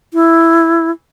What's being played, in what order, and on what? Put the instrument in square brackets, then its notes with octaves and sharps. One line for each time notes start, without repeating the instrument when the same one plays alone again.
[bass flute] E4